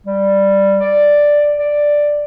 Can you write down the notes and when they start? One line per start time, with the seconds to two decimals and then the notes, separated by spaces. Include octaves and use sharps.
0.07 G3
0.80 D5
1.59 D5